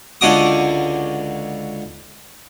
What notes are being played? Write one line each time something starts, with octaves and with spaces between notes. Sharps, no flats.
C#2 D3 C#4 F#4 D6 D#6